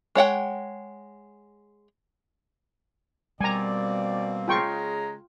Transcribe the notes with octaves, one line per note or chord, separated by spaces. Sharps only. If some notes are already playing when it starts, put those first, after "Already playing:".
G#3 C#5 F#5 G5
B2 G3 A#3 C4 D5 G#5 A#5
C#3 G#3 F4 G5 A#5 C#6